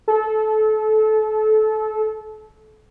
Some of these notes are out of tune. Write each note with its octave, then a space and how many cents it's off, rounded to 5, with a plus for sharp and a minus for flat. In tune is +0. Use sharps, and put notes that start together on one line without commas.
A4 -25